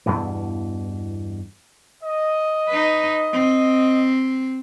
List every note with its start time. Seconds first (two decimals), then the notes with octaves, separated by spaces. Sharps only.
0.06 E2 G2 B2 E3
2.04 D#5
2.69 D#4 B4
3.33 C4